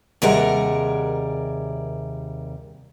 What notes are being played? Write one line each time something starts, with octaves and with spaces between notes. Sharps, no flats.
D#2 C3 G3 G#4 A#4 F#5